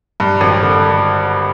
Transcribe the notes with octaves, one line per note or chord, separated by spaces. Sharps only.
G2
G#1
D3